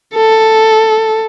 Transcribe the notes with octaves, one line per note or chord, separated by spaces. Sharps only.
A4